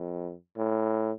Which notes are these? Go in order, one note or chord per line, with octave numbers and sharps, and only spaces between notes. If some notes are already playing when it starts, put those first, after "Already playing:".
Already playing: F2
A2